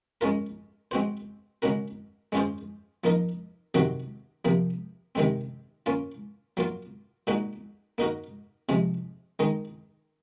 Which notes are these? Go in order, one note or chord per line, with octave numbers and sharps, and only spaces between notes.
G#3 C#4 F4 A#4
G#3 C4 F#4 C5
C#3 G#3 C#4 F#4 A#4
G#3 C#4 F4 G#4 C5
F3 A#3 D#4 A#4
C3 D#3 F#3 C4 F#4
C3 F3 A#3
C3 D#3 G#3 C4
A#3 C#4 F4
F#3 A#3 F4
A#2 G#3 D#4 F#4
A#3 D#4 F#4 A#4
C3 F3 G#3
D#3 G#3 D#4